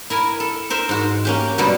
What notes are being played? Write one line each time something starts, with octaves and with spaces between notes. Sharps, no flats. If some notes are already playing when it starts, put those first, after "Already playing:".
E4 A#4 G#5
A4
A#4 C5 E5
G#2 F#4
A#3 C#4 G4
G2 B2 D3 F#3 G3 A3